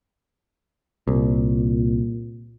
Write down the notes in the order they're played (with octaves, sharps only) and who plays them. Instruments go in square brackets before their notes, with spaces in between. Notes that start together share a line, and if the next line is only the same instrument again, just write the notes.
[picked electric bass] C2 [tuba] A#2